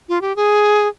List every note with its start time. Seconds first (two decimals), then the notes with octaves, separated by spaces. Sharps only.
0.09 F4
0.21 G4
0.36 G#4